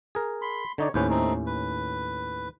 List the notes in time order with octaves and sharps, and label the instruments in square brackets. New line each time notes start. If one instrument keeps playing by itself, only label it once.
[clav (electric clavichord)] G#4 A#4
[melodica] B5 C6
[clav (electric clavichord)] D3 D#4 D5 [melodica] C#5
[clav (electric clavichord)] D#2 A2 C#4 [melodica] B4 C5
[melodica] A3 C4 D#4
B4